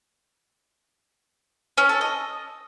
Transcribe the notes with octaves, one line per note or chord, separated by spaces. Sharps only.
C#4
A4
D#5